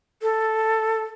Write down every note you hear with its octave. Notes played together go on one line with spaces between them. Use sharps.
A4